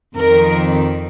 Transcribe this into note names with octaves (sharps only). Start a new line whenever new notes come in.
F2 D#3 A#4